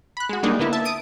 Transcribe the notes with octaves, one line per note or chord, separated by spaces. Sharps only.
B5 F#6
G#3 F#4
G3 G#3 A#3 D4 D#4
D3 A#3 B3 E4
E5 A5
D#6 D7 D#7